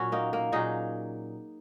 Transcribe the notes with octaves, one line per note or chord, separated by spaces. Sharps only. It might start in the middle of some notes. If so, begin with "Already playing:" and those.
Already playing: A#2 F#3 C#4 F#4
A#3 D#4
A#3
A#2 F#3 D#4 G#4